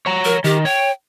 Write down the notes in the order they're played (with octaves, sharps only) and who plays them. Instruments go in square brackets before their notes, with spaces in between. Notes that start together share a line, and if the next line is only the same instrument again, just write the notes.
[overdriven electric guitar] C#5 A#5
[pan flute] A#4
[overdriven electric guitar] D#3 [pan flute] G4
[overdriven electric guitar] C#5 [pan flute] G5